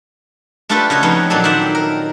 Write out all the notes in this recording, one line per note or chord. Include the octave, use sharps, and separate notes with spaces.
A3 D4 F4 G4 A4 B4
C#3 F#4 C#5 D#5
F2 F3 G#3 B3 D#4 C#5
A#2 F#3 C4 D4 A4
D#3 C5 D5 E5 F#5
A#4